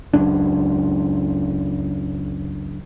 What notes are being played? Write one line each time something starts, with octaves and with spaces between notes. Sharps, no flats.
C#2 F#2 D4